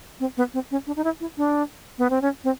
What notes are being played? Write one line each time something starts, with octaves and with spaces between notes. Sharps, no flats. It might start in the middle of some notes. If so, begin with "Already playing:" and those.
C4
B3
C4
C#4
D4
D#4
E4
E4
D4
B3
C4
C#4
C4